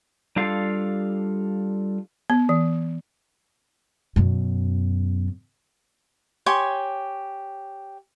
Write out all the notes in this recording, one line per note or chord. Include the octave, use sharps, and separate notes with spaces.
G3 D4 F4 A4 F5
B3
E3
F#2 B2
G4 C#5 G#5 C6